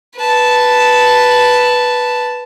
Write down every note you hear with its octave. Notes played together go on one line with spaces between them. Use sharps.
B4 A5